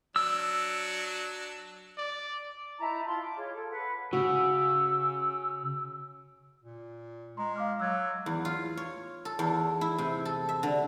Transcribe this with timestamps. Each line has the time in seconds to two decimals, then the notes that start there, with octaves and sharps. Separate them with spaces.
0.16 F#3 D4 E6
1.98 D5
2.79 D#4 E4 A5 A#5
3.06 F4 A5 C6
3.21 D6
3.37 F4 G#4 C#5
3.53 A4
3.70 B4 F#5
4.13 C#3 F#4 E6
6.63 A#2
7.37 G#3 A#5 C6
7.56 F5 D6 F6
7.80 F#3 E6 F#6 G#6
8.26 E2
8.45 F4
8.77 C#5
9.25 A4
9.39 E2
9.81 E4
9.98 C3
10.25 A4
10.49 E5
10.63 D3